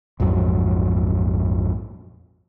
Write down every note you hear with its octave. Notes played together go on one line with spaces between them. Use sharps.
A#1 F2 G#2 F#3